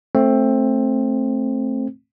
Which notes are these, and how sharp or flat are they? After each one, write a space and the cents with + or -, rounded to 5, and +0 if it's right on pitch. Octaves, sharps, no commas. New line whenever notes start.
A3 +0 C4 +15